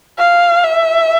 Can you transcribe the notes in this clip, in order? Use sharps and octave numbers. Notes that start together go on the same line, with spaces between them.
F5
E5